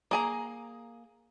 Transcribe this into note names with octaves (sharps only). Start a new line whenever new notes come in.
A#3 G#4 A#5